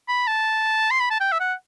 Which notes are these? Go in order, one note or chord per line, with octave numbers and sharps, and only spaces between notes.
B5
A5
C6
B5
A5
G5
E5
F#5